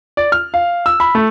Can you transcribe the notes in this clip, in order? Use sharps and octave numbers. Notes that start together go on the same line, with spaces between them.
D5
F6
F5
E6
B5
A3